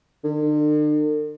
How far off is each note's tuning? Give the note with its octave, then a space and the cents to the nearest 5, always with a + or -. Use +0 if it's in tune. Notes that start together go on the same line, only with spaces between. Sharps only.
D3 +45